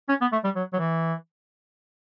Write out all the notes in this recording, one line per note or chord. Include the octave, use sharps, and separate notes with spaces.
C#4
B3
A3
G3
F#3
F#3
E3